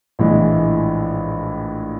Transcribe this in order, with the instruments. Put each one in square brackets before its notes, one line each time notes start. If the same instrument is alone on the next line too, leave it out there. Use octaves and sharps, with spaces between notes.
[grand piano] A#1 A2 E3 G#3